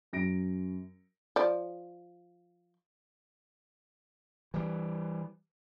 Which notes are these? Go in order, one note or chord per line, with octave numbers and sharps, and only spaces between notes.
F#2 A#6 D7
F3 D5
E3 G3